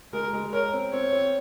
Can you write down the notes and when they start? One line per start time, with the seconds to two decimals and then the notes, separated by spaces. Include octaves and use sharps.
0.13 G#3 A#4
0.33 G#3
0.53 A#4 C#5
0.73 C4
0.93 C4 C#5
1.12 C4